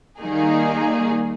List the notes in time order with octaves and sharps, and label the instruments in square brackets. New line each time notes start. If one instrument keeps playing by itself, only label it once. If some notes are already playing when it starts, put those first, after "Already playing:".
[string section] D#3 G3 A#3 D#4 G#4